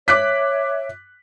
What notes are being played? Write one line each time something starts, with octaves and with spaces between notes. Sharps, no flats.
C#5 E5 D6 F#6 B6